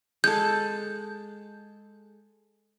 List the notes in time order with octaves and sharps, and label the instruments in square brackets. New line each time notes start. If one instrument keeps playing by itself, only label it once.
[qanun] G#3 A4 [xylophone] G6